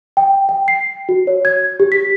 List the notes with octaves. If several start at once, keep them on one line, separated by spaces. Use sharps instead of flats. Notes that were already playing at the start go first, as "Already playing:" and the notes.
G5
G5
C7
F#4
C#5
G#6
G4
B6